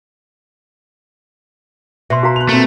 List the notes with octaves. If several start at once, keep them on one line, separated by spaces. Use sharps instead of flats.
B2 E5 C6
F#4 F5 A#5
F#6 F7
A#2 A3 C4